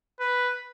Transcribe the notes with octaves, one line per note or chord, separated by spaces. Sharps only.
B4